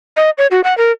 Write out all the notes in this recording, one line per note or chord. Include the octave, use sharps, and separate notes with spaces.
D#5
C#5
F#4
F#5
A#4